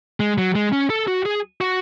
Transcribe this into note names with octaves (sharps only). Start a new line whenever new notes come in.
G#3
F#3
G#3
C#4
A4
F#4
G#4
F#4